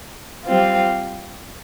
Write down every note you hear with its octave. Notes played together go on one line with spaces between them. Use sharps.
G3 C4 F4